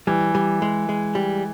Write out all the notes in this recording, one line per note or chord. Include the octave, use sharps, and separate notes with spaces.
E3 G3
G3
G#3
G#3
G3